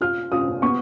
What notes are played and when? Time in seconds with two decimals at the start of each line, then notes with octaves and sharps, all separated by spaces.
0.01 F4 F6
0.32 F4 D#6
0.62 B3 C#6